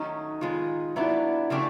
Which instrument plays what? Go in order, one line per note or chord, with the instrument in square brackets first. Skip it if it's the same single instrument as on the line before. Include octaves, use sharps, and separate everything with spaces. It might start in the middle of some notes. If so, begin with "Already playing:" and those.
Already playing: [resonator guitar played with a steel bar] D#3 F#3 A3 C#4 [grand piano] D#4
[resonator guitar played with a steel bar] D#3 G#3 B3 [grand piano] F4
[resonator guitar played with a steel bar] F#3 B3 D4 [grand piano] E4
[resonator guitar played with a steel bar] C#3 F3 A3 D4 G4